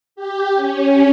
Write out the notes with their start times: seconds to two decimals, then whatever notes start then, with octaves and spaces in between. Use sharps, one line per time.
0.16 G4
0.55 C#4